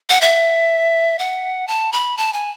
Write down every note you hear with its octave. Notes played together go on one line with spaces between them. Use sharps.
F#5
E5
F#5
A5
B5
A5
G#5